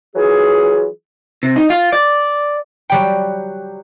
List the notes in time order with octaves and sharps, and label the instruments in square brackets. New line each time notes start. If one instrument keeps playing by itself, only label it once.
[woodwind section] E3 F#3 F4 G#4
[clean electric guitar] C3
D#4
F4
D5
[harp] F#3 G3 G5